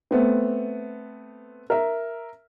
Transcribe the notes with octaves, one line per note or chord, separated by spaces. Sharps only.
A3 B3 C4
A#4 E5